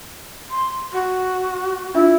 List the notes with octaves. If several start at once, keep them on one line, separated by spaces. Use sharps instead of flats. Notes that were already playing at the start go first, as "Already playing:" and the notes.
C6
F#4
D4 E4 F4 E5